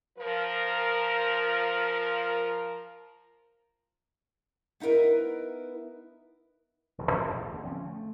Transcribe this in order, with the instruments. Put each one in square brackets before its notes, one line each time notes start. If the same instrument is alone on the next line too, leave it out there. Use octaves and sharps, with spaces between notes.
[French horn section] F3 A#4
[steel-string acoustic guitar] B3 D#4 E4 A#4 B4
[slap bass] E1 C2 G#2 C#3
A2 C#3 F3 G#3
A1 E2 G2
D3 A#3
D3 F3 C4 C#4
A3